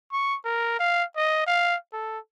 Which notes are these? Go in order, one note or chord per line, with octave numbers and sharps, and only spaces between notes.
C#6
A#4
F5
D#5
F5
A4